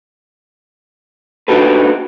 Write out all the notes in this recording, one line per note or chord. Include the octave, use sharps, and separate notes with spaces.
D4 D#4 F#4 G4 A4 B4